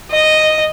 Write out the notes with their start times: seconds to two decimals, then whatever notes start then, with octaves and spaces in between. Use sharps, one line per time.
0.12 D#5